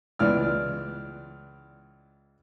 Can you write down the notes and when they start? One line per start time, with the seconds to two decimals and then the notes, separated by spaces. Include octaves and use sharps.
0.19 C#2 E3 D5 F6